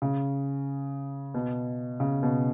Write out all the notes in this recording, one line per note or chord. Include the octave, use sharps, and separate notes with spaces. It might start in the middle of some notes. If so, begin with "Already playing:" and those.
C#3
B2
C#3
B2